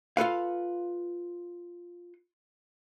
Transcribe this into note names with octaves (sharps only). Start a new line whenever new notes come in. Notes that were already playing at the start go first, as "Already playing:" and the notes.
F4 A4 B4 F5